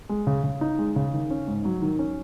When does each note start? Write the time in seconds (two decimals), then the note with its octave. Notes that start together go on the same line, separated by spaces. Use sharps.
0.09 G#3
0.27 C#3
0.44 C#3
0.61 D#4
0.79 G#3
0.96 C#3
1.13 D#3
1.30 C#4
1.47 G#2
1.65 F#3
1.82 D#3
1.99 C#4